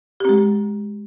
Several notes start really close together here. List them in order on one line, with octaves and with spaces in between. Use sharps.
G4 C4 G#3